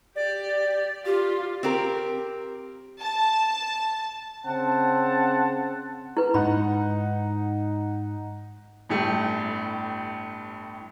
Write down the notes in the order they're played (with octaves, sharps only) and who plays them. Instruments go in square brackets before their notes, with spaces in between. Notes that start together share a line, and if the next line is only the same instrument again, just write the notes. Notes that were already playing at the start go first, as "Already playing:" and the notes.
[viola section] G4 [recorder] D5
[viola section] F4 [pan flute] G4
[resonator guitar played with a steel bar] C4 G4 A#4
[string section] A5
[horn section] C#3 C4 F#5 A5
[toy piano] E4 B4
[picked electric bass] G#2 G#3 [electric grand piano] D#4 F#5 F#6 [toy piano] B5
[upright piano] G1 A2 A3 G4